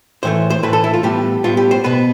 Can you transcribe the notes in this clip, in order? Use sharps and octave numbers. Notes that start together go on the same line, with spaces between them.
A2 E3 A3 C5
C5
A2 E3 A3 B4
A4
E4
F4
A2 G3 B3 G4
A2 G3 B3 F4
G4
C5
B2 B3 B4